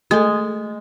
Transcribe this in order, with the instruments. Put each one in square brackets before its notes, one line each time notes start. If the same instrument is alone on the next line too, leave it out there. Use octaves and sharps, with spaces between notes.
[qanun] G#3 [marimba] A3 A4